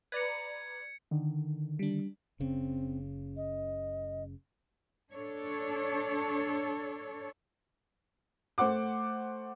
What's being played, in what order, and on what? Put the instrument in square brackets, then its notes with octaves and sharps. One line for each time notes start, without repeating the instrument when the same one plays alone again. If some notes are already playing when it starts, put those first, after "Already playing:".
[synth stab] B4 D5 A#5 [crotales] G#6 C#7
[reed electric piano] D3 D#3
[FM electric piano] G3 D4
[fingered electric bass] F#1 C#3 [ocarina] C4
[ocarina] D#5
[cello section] D4 A4 C#5
[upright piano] A3 C5 F#5 D6